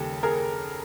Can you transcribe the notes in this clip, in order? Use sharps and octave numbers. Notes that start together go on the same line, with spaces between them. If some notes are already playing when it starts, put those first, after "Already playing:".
Already playing: D#2 C#3 G3 G4 A4
G#4 A#4